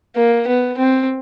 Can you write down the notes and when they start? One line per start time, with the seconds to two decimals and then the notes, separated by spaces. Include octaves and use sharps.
0.16 A#3
0.47 B3
0.78 C4